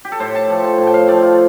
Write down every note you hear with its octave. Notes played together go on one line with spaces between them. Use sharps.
G4
A4
A2 C5
A5
F3 A3
A5
A2 A5
G5
F5
F3 A3 D5
F4